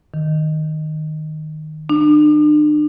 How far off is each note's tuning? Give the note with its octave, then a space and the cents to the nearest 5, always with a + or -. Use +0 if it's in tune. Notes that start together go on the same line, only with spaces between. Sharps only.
D#3 -10
D4 +40